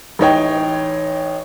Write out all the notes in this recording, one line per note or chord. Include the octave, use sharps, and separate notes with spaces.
A1 D#4 C#5 G5